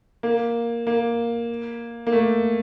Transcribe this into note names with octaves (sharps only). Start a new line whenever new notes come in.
A#3
A#3
A#3
A3